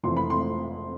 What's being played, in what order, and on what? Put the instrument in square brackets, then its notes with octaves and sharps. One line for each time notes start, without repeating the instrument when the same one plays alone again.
[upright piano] F1 F2 E3 C6
B5
C6